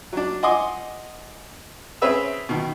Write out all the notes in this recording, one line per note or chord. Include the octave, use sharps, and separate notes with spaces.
F#3 D4
D#5 F#5 G#5 C6 D6 D#6
C4 C#4 G#4 B4 E5 E6
B2 D#3